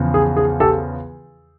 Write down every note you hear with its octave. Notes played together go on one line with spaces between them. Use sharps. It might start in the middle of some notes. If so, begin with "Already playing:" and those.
Already playing: E2 C#3 F3
G#4
G#4
G4 A4